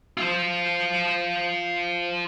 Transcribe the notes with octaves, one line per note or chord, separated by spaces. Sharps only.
F4 C5